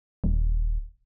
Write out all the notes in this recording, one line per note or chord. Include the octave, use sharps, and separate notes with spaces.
D#1